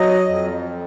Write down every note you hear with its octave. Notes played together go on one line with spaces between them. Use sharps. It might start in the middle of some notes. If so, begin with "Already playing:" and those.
Already playing: F#3 D#5
F2